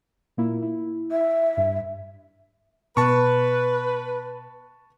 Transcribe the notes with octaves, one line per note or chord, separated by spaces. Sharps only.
A#2 A#3 E4
E4
E5
G2
B2 B4 A5 C#6